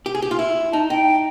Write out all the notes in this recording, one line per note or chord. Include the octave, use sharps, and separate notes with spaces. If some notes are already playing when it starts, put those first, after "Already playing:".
G4
G#4
G4
F4
E4
D#4 A5
D#4 G5